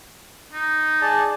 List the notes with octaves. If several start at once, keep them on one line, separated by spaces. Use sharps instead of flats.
D#4
G#4 D5 A5